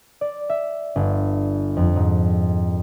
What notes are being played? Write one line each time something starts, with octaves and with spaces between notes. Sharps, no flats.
D5
E5
G1
F2
G#2